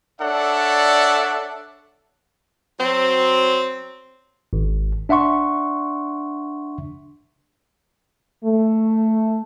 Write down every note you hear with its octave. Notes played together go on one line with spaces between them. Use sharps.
D4 A4 C#5 D5 E5 F#5
F#3 C4
G#1
D4 E5 F#5 C6 C#6
A3